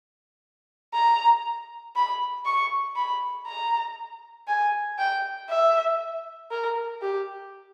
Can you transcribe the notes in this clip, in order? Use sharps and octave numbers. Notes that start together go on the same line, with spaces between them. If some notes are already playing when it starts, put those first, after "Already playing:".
A#5
B5
C#6
B5
A#5
G#5
G5
E5
A#4
G4